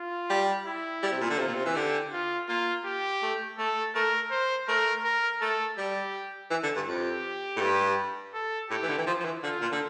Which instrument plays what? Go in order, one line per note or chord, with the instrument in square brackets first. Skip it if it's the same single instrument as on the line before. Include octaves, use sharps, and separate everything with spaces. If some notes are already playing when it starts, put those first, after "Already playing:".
Already playing: [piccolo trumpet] F4
[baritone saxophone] G3
[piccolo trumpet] E4
[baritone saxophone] G3
C3
A#2
D3
[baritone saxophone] C3 [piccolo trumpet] F4
[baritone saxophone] A#2
C3
E3
[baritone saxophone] D3 [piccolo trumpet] G4
[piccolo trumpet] F4
[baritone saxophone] A#3 [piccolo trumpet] F4
[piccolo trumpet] G4
[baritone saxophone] A3
[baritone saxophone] A3 [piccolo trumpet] A4
[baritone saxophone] A3 [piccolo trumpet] A#4
[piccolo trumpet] C5
[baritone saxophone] A3 [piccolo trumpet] A#4
[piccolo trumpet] A#4
[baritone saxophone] A3 [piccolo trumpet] A4
[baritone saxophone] G3 [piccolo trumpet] G4
[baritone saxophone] E3
D3
G2
[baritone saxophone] F2 [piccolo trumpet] G4
[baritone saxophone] A2
G2
[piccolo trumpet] A4
[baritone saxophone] A2 [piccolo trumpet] G4
[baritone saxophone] E3
D3
E3
F3
F3
E3
[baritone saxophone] D3 [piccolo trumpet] F4
[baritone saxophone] A#2
D3